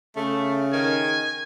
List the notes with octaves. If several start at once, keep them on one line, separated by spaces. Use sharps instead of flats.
C#3 A3
D#3 G#5